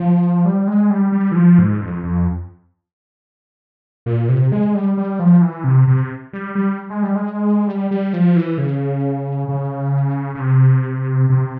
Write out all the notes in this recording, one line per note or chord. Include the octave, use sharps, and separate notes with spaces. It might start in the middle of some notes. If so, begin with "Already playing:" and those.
Already playing: F3
G3
G#3
G3
G3
E3
F3
G#2
F2
F2
A#2
C3
G#3
G3
G3
F3
E3
C3
C3
G3
G3
G#3
G3
G#3
G3
G3
F3
E3
C#3
C#3
C#3
C3
C3